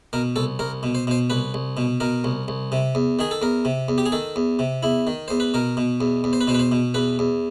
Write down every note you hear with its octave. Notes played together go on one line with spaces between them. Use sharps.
B2 A#4
C2 A4
C2 A#4
B2
C5
B2 C5
C2 B4
C2
B2
B2 A#4
C2
C2
C3
E2
D#3 G#4
A4
E2 A#4
C3
E2
G4
G#4
D#3 A4
E2
C3
E2 E4
D#3
E2 C5
B4
B2 A#4
B2
E2
E2
C5
B4
B2 C5
B4
C5
B2
E2 B4
E2